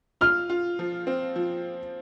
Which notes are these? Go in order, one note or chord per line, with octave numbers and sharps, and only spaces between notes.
F4 F6
F4
F3
C4
F3